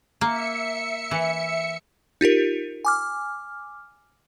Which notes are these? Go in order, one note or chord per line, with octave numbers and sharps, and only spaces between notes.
A#3 E5 C#7
E3
D#4 F4 G4 A#4
G#5 D6 F6